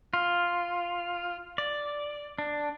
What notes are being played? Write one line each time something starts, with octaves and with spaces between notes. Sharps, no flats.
F4
D5
D4